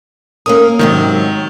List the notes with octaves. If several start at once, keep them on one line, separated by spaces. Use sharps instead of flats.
A#3 C#4 A#4 D#6
G#2 C3 D#3 F#3